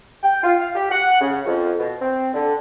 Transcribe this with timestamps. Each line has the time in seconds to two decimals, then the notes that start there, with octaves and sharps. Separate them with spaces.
0.23 G5
0.43 F4
0.60 F5
0.75 G4
0.91 F#5
1.20 C#3
1.46 F2
1.79 B2
2.01 C4
2.34 D3